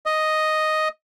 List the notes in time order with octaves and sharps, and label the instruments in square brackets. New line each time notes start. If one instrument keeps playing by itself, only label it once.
[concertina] D#5